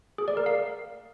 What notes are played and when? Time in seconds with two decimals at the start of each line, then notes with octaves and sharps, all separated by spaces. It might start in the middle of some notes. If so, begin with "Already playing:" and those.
0.18 G#4
0.28 D5
0.37 A#4
0.46 F5